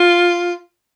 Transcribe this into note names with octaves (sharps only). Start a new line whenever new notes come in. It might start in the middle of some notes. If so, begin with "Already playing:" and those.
Already playing: F4